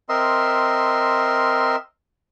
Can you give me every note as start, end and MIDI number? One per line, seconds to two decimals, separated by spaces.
0.09 1.76 60
0.09 1.76 70
0.09 1.76 75
0.09 1.76 76
0.09 1.76 84